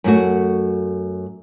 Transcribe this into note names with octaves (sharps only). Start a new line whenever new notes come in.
F#2 A3 F#4